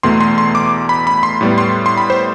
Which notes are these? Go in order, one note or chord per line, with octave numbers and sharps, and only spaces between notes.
E2 B2 A3 C6
C6
C6
D6
B5
B5
C6
A2 G3 B3
C6
C6
B5
C5